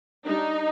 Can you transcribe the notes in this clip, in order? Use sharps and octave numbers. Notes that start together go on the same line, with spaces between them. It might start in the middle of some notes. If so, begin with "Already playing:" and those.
G3 D4 D#4